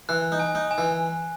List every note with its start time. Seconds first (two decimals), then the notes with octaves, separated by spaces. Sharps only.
0.09 E3 F#6
0.32 D#4
0.39 G#5
0.55 D#4
0.71 G#5
0.78 E3